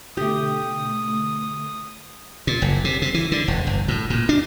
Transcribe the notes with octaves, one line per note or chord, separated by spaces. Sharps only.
B2 D3 A3 G4 D#6
A#2
F#1
C3
C3
E3
D3
E1
G1
A2
A#2
D4